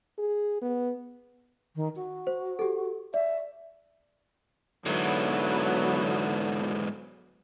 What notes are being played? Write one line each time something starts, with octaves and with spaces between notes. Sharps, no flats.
G#4
B3
D#3
F#4
C5
G4 A4
D5 E5
G#2 D3 E3 F#3 B3